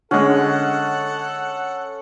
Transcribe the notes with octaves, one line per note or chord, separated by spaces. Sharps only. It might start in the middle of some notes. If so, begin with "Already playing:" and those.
D3 G#3 C#4 A4 F#5